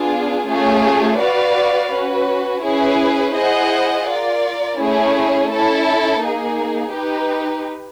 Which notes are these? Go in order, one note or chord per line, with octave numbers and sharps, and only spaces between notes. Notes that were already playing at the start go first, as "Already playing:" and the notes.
Already playing: B3 D4 F4 G#4
A3 C#4 F4 G#4
F#4 B4 D5 F5
C#4 F#4 B4
C#4 E4 G#4 B4
E4 G#4 C5 D#5 F#5
F4 A#4 D5
A3 C#4 E4 G#4
C#4 E4 A4
A#3 D#4 G#4
D#4 G4 B4